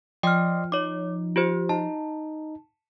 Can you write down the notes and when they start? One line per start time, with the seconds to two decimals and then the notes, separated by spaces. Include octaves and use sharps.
0.23 F3 D5 D#5 G5 C6 F6
0.72 D#4 C#5 D6
1.36 F4 G4 C5
1.69 D#4 A5